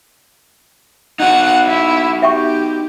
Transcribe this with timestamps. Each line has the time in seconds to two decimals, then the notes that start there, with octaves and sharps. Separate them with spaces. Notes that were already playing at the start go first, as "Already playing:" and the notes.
1.20 D#4 F#4 F#5
1.67 E4
2.22 G4 E5 G5 C#6